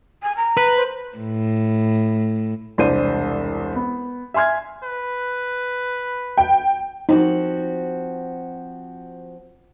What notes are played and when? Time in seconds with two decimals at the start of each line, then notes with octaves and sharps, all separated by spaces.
0.23 G#5
0.37 A#5
0.57 B4
0.77 C5
1.18 A2
2.78 E1 C2 D4 C5 D#7
3.75 B3
4.34 E5 G#5 C6 F6 G#6
4.84 B4
6.37 G5
7.09 F3 C4 D#4 F#4